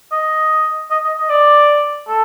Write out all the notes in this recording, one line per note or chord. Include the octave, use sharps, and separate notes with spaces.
D#5
D#5
D#5
D#5
D5
A4